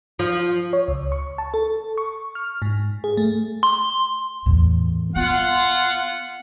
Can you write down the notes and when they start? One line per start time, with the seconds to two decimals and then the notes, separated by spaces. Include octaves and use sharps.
0.19 F3
0.73 C#5
0.88 C#2
1.12 C#6
1.38 A5
1.54 A4
1.98 C#6
2.35 F6
2.62 G#2
3.04 G#4
3.17 A3
3.63 C6
4.46 E2 A2
5.16 B3 F4 F#5